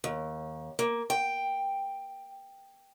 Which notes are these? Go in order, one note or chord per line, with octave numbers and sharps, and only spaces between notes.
D#2
A#3
G5